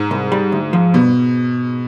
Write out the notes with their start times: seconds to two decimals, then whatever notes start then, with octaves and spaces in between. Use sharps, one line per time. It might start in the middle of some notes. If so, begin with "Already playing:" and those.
Already playing: G#2
0.11 C2
0.32 G3
0.52 D2
0.73 F3
0.94 G2 B2